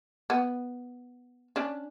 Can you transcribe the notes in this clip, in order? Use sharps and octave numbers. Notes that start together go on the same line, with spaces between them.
B3
C#4 D4